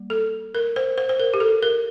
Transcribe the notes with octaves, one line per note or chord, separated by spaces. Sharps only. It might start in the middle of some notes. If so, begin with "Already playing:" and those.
Already playing: G3 A#3
A4
A#4
C5
C5
C5
A#4
G4
A4
A#4